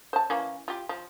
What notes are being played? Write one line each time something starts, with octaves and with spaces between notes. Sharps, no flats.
C5 A5
E3 A#3 C#4
F4 G4
F3